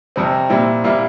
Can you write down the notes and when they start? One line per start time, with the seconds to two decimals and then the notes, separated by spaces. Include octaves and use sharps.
0.16 F2 C3 G3 C4
0.50 A#2 G3 C4 E4
0.84 A#2 G3 A#3 E4